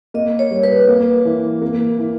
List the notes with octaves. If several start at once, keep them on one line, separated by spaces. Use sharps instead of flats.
A#3 D#5
C#5
G3
B4
A#3
E3
A#3
E3